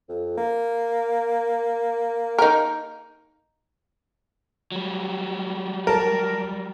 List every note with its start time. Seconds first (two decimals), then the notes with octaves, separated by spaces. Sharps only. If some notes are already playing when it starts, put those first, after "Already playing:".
0.09 F2
0.37 A#3
2.39 D#4 A#4
4.72 F#3 G3
5.87 A#4 A5